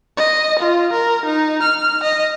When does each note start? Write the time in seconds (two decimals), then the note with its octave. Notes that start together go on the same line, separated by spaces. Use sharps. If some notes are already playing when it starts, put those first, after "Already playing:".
0.17 D#5
0.59 F4
0.92 A#4
1.25 D#4
1.62 F6
2.03 D#5